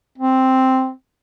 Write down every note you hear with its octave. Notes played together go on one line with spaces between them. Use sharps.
C4